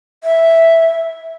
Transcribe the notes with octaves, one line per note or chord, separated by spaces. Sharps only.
E5